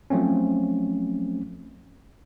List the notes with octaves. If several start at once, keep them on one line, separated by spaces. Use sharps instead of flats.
F3 F#3 A3 C4 C#4